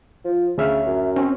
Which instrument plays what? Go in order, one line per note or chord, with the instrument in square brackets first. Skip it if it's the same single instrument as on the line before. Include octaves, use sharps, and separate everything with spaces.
[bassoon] F3
[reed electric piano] D2 E5 F6 [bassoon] C#3
[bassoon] F#2
[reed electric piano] C4 C#4